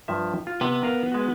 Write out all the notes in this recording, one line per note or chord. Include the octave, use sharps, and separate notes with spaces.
G2 F3 E5
F4
C3 B3
A#4 F5
G#3 F#4